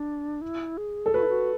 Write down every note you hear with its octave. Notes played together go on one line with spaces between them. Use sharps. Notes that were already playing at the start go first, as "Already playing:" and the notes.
Already playing: D4
E4
G#4
A4
F#4 B4
E4
F#4